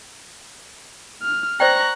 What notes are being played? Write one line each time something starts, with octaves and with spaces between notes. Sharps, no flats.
F6
C5 D5 G5 A#5 C#6 F#6 A#6